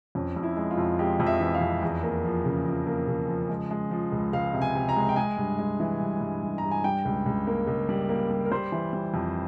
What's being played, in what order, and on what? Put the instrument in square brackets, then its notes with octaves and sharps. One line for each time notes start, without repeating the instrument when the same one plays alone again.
[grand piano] F2 C#4
F2
E4
G#3
F4
F2
G#3 G4
F2
E5
E3
F5
F2
E2
A#3
F3
C#3
F3
A#3
C#3
F3
G#3
G#3
F3
C#2
C#2 F5
C3
G#5
C3
A#5
G#3
G5
G#3 G#5
G2
G#3
E3
G2
G2
G2
G2 A#5
G#5
G3 G5
C#2
C#2
A#3
C#2
G3
A#3
G3
A#4
G3 C5
E3
G3
F2